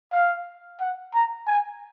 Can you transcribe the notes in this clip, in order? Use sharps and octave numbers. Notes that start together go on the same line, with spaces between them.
F5
F#5
A#5
G#5